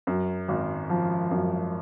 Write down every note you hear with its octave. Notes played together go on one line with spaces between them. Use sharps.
F#2
G#1
F3
F#2